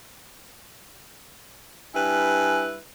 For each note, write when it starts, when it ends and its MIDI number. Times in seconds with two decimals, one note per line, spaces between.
1.95 2.77 43
1.95 2.77 64
1.95 2.77 71
1.95 2.63 80